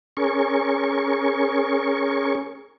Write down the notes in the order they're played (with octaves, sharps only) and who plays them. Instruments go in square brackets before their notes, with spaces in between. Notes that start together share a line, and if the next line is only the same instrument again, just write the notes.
[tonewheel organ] C#4 G#4 A#4 C#6